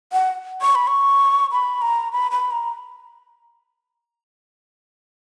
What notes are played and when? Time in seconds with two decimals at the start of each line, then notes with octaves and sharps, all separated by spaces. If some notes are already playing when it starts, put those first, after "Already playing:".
0.13 F#5
0.62 C#6
0.75 B5
0.87 C#6
1.52 B5
1.82 A#5
2.12 B5
2.31 B5
2.51 A#5